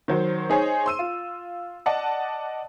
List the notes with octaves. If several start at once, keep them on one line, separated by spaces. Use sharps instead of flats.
D#3 F#3 C5
D#4 G#4 C5 C#5
C6 E6 D#7
F4
D5 D#5 F#5 A5